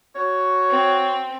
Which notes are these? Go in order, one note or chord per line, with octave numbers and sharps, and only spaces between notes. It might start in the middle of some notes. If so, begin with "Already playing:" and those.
F#4 C#5
C4